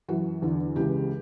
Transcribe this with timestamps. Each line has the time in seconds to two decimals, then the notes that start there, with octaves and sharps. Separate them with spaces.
0.08 F#2 E3 F#4
0.42 E2 D3
0.76 C#2 C#3 E3 G4